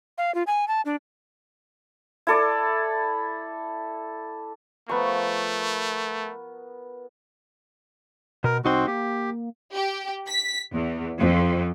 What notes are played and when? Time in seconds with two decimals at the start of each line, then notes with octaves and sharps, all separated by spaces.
0.18 F5
0.35 F4
0.47 G#5
0.68 A5
0.85 D4
2.27 E4 A4 D5
4.89 F3 A3 B3 A#4 C#6
8.44 B2 A#4
8.65 C2 C4 D#4 F#4 C6
8.87 A#3 G4
9.73 G4
10.28 B6
10.72 E2
11.19 F2